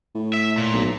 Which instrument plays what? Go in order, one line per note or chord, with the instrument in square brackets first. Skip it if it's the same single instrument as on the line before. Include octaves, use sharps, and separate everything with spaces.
[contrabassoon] A2
[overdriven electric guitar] E5
A#2
[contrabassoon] B1